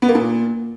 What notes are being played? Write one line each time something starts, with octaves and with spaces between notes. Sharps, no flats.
B3
A#3
A#2